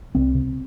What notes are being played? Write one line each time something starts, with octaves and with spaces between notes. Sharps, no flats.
C2 C4
C3